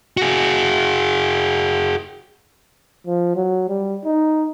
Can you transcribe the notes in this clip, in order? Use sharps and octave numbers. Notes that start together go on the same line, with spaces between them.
F#4 G#4
F3
F#3
G3
D#4